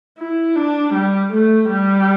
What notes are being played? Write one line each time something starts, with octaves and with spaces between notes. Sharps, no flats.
E4
D4
G3
A3
G3